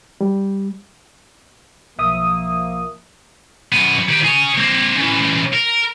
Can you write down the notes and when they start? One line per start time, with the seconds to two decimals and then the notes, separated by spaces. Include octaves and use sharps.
0.21 G3
1.98 B1 F3 A#3 E5 D#6
3.72 F#2 B3
4.09 D#3 G4
4.24 G#4 C#5
4.57 A#3 C4
4.96 C#3 E3
5.53 A#4